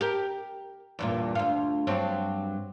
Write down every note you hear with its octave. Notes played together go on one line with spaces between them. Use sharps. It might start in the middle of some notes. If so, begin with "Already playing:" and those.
G4 A#4
E2 G2 A#2
D2 F4
G2 F#3 C4